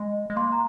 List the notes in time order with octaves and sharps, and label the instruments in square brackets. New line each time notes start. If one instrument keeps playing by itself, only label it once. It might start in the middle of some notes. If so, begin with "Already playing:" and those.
Already playing: [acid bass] G#3
G#3
[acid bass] A#3 [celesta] C6
[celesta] A#5